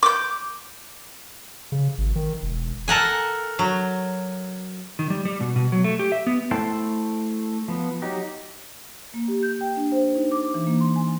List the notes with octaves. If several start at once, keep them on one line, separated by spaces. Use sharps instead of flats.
D6 G6
C#3
G#1
D#3
E1
A4 A#4 F#5 G#5
F#3
D#3
G3
G3
B2
B2
F#3
A3
G4
E5
B3
A3 E4 C5 G5 A5
F3 B3
F#3 D#4 G4
A#3
G4
G6
G5
D4
C5
D#4
D6
E3
A#3
C6
G#5